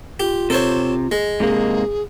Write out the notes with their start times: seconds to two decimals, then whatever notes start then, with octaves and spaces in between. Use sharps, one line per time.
0.20 F4 G4
0.50 C3 A4 C5 C#5
1.12 G#3
1.40 G#2 C3 A#3 G#4